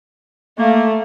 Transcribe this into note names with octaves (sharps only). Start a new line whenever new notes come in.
A3 A#3